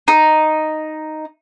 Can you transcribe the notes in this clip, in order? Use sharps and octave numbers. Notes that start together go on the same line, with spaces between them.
D#4